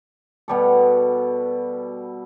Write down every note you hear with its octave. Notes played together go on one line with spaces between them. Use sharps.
B2 G3 A4